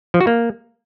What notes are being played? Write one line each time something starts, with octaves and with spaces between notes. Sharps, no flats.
F3
F#4
A#3